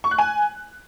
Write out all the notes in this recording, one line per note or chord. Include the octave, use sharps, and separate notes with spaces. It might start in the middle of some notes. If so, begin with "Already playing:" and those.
C#6
F#6
G#5